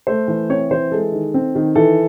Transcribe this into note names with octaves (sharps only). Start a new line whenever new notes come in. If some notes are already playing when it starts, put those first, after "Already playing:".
A3 C5
E3
C4 C#5
E3 C5
G#3 A4
D#3
C4
D#3
E3 A4